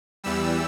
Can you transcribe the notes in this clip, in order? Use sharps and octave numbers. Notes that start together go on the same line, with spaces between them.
E2 E3 G3 E6